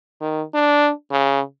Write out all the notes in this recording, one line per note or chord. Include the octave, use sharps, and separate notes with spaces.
D#3
D4
C#3